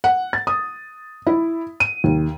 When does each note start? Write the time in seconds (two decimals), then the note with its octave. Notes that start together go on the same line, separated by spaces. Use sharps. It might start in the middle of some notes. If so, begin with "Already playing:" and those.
0.04 F#5
0.33 A6
0.47 D#6
1.27 E4
1.80 D#7
2.04 D#2